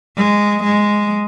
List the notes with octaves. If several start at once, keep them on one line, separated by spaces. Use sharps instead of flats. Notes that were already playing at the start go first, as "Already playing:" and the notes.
G#3
G#3